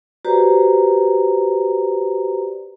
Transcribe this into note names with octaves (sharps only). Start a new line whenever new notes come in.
F#4 G4 B4 C5 D5 A#5